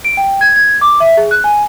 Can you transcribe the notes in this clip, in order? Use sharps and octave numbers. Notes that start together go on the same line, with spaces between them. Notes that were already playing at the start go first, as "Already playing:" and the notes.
D7
G5
G#6
G#6
D6
E5
G#4
F#6
G#5